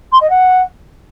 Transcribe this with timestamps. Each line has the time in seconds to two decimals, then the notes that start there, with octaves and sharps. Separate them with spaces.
0.12 C6
0.20 D#5
0.29 F#5